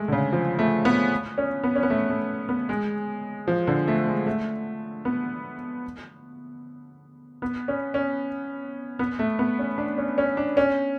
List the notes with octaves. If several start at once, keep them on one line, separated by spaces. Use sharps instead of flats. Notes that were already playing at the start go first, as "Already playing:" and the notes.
Already playing: G#3 A3
D3
C#3
F3
A3
B3
C#4
B3
C#4
B3
A3
A3
B3
G#3
F3
D3
A3
G#3
A3
B3
B3
C#4
C#4
B3
A3
B3
C#4
D4
C#4
C#4
D4
C#4